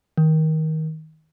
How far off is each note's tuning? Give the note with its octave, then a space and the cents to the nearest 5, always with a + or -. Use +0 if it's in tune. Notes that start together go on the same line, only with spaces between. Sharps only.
D#3 +20